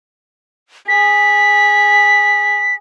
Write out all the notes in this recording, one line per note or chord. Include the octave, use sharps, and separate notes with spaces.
G#4 B6